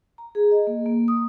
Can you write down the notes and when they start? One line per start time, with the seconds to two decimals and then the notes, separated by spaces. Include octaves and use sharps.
0.18 A#5
0.35 G#4
0.51 D#5
0.67 A#3
0.86 A#3
1.08 D#6